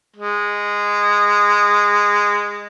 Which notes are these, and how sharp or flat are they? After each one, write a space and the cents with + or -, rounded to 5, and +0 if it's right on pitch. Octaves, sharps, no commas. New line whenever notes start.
G#3 -15